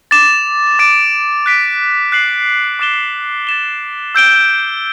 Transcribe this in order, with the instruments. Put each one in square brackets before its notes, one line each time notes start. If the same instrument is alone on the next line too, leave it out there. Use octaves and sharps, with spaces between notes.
[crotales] D6 A6 E7
D6 A6 D7
F#6 B6 D7
F#6 C7 F#7
D6 F#6 A6 E7 G7
A6 E7 G7
E6 G6 D7 G7